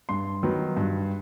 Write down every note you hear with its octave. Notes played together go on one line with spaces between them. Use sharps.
G2 C6
D#3 F#3 B3
G2